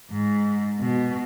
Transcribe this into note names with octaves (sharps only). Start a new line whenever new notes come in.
G#2
B2